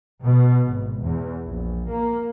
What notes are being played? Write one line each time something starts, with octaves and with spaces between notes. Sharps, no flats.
B2
G#1
E2
A#1
A#3